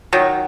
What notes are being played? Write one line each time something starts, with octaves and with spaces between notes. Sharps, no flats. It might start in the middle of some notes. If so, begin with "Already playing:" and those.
D#3 F#3